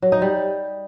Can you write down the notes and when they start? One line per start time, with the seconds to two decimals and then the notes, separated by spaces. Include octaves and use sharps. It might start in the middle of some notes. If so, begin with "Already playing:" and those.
0.02 F#3
0.12 D#4
0.22 G3